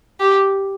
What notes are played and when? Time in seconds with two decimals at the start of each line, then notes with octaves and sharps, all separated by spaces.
0.20 G4